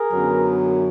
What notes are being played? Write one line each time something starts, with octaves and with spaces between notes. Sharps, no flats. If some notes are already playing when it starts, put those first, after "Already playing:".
Already playing: G#4 A#4
F#2 D3 F#3 B3